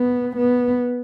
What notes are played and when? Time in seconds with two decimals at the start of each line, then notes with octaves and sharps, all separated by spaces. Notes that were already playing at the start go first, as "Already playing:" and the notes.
Already playing: B3
0.37 B3